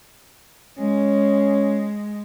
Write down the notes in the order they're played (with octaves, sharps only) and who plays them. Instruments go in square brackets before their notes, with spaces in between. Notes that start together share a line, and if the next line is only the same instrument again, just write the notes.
[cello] G#3 [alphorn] C#4